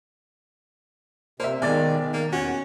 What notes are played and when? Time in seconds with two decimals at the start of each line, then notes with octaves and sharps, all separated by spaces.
1.40 C3 A#3 C5 E5
1.62 B1 D#3 G#3 D5 A6
2.13 D#3 A#3
2.32 E2 C#4 F#4